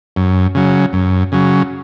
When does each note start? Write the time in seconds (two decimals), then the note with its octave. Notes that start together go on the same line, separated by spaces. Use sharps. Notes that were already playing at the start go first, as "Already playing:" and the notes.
0.16 F#2
0.55 C#3 F#3
0.93 F#2
1.32 C#3 F#3